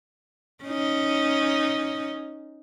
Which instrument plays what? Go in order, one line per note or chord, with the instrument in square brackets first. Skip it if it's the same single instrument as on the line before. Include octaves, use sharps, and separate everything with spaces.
[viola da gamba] C#4 D#4